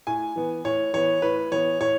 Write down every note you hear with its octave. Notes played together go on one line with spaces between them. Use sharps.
A2 G#5
E3 B3
A2 C#5
E3 B3 C#5
A2 B4
E3 B3 C#5
A2 C#5